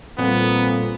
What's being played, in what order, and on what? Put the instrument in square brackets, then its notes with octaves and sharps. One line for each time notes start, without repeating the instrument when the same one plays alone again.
[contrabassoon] F2 [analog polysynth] A#2 [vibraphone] G3 F4 A4 [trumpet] B3